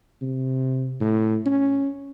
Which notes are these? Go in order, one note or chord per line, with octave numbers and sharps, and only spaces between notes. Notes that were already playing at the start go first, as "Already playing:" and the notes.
C3
A2
C#4